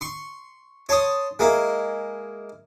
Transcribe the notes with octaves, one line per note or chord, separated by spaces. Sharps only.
C6 C#6
C#5 A5 C6 D#6
G#3 A#3 E4